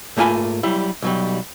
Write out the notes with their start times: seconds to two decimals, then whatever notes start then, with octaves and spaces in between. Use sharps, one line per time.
0.17 G#2 A3 A#3 F4 G#5 B5
0.63 F#3 G3 E4
1.02 B1 F#3 G3